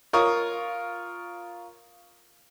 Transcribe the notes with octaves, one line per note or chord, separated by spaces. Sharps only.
F4 A#4 C#5 C#6 D#6